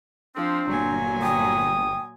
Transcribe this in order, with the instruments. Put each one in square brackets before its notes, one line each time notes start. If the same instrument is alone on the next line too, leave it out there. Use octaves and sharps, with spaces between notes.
[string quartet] F3 [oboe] C4 [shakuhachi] D4
[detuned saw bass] G1 [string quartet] A#2 F#3 G#5
[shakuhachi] G5 [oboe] D#6